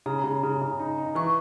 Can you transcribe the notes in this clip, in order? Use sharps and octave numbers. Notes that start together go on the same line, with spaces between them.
C#3 A#5
C#3
C#3
C#3
D#4
D#4
E3 C#6